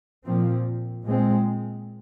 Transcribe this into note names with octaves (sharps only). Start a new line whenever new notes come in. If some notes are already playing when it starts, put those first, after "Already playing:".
A#2 F3 C4
A#2 G#3 C4